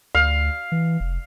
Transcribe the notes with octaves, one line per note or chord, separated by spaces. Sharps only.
D2 F5
E3
F1